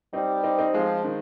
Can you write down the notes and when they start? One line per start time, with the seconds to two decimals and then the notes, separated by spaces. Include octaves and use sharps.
0.13 G3 C4 D#4
0.44 C4 D#4
0.59 C4 D#4
0.74 F3 G#3 C4
1.04 D#3